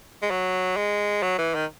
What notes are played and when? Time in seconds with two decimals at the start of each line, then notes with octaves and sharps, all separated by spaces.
0.22 G#3
0.31 F#3
0.77 G#3
1.23 F#3
1.38 E3
1.55 D#3